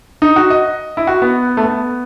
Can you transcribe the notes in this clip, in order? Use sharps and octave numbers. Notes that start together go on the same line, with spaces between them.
D#4
F#4
D#5
E4
F#4
B3
A3
B3